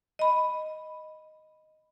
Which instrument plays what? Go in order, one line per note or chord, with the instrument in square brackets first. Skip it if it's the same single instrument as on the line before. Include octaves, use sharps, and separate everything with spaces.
[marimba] D#5 B5